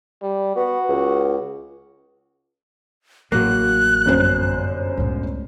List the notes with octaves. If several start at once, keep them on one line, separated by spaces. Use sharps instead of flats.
G3
B3 F#4
C#2
A1 F#3 A#3 F#6
G1 F#2 C5
C#2 A2